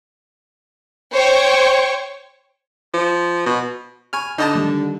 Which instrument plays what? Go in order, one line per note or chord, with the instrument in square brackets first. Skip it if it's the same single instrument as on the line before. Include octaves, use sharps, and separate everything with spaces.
[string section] C5 C#5 G5 C#6
[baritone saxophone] F3
B2
[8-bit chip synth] G#5 F6 [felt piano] B5 C#6
[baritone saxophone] D3 [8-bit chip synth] D#4 D#5 A5 [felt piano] B5 D6 D#6
[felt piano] D#3 G3 F#6